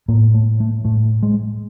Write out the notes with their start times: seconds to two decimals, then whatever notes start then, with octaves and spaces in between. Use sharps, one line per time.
0.08 A2 A#3
0.34 A3
0.60 A3
0.85 A2 A3
1.23 G#3